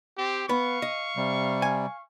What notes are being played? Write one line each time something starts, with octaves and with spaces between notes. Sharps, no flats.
C4 G4
B3 F5 B5 C#6
D#5
C3 G3
G#5